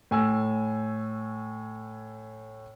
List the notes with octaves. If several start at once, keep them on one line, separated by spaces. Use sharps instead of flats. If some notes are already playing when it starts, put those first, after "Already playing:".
A2 G#5 E6